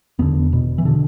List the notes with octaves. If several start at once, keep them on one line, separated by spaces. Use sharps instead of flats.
F1 E2 D3 B3
E1 E2 B2
E3
B2 D3